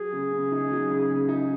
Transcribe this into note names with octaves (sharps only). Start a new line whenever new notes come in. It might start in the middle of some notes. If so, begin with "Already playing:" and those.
Already playing: F#3 G#4
C#3
C#3
D#4
F#3
C#3
C#3
D#4